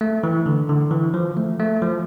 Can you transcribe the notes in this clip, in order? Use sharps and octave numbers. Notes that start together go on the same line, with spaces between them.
A3
E3
D3
D3
E3
F3
A3
A3
F3